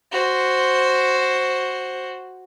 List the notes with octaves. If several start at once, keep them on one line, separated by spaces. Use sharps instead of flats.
F#4 C5